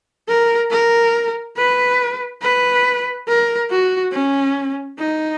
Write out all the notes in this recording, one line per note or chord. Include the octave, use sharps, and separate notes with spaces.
A#4
A#4
B4
B4
A#4
F#4
C#4
D#4